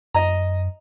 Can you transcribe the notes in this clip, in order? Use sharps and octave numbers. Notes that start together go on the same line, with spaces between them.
F#2 D#5 A#5